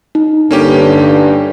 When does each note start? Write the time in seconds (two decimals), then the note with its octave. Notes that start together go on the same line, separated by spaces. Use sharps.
0.15 D#4
0.51 G2 D3 A#3 C#4 G4